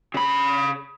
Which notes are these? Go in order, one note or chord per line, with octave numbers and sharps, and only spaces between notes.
C#3 B5